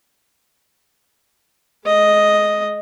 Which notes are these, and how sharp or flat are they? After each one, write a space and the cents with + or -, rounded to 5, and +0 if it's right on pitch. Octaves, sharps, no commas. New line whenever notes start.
G#3 +30 D#5 +0